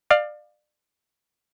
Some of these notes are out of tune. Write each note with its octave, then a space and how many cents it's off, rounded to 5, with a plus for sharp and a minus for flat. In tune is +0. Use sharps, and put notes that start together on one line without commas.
D5 +30 F5 +10